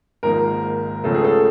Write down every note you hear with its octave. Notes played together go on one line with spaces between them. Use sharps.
G#1 G#2 F3 A#3 A#4
C#2 C#3 F3 A3 A4
G#4
A4